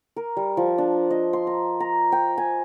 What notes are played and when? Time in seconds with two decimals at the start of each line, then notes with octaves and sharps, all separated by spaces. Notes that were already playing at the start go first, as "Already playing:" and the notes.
0.16 A#4
0.37 G3
0.57 F3
0.78 D4
1.11 D#5
1.33 C6
1.47 A#5
1.80 A#5
2.12 G5
2.38 G#5